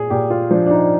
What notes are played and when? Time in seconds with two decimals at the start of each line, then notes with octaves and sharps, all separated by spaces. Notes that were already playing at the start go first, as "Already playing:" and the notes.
Already playing: A#2 G#4
0.10 A#2 G4
0.30 F4
0.51 F3 D4
0.66 D4
0.71 D#4